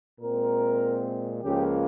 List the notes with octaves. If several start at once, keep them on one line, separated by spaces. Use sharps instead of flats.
A#2 G#3 C4 A#4
C#2 C#3 F3 A#3 G4